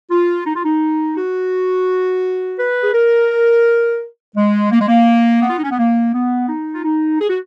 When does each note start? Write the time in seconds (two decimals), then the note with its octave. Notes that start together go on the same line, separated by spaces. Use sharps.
0.11 F4
0.46 D#4
0.56 F4
0.64 D#4
1.18 F#4
2.58 B4
2.83 G#4
2.94 A#4
4.36 G#3
4.72 A#3
4.80 G#3
4.88 A#3
5.43 B3
5.50 F4
5.58 D#4
5.64 C#4
5.71 B3
5.78 A#3
6.14 B3
6.49 D#4
6.73 F4
6.85 D#4
7.20 G#4
7.29 F#4